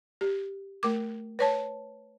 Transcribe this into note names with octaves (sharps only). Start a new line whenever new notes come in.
G4
A3 A#4 D6
B4 C#5 A5